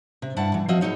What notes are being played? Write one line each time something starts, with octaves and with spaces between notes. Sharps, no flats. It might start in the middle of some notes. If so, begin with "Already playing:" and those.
C3
G2 E4 F#5 A5
E3
F3 C4 F4 F#4 D#5 E5
E2 E3 D#4 C#5